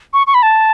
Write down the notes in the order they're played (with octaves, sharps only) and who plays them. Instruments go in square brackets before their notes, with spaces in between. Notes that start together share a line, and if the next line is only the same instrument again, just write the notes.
[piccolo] C#6
C#6
B5
A5